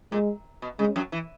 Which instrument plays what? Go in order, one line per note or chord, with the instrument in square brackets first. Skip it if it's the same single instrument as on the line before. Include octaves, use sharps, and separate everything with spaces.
[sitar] A#2 [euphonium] G#3
[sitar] B2
[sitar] C#3 [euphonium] G#3
[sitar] F#2 F#3
E3